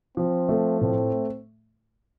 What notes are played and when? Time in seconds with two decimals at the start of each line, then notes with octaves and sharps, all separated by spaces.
0.17 F3 C4
0.49 A3
0.81 A2 C4